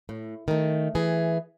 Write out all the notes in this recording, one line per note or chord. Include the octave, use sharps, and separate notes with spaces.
A2
D#3 A3
E3 G#4